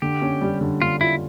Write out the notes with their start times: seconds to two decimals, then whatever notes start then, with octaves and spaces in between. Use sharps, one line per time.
0.02 D3 G4
0.22 C#4
0.41 G3
0.61 D3
0.81 D3 F4
1.01 E4 F4